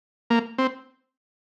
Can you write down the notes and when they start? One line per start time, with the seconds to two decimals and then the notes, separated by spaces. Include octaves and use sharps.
0.30 A#3
0.58 C4